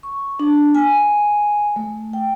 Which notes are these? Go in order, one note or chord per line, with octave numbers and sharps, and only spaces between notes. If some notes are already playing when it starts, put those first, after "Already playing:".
C#6
D4
G#5
A3
G5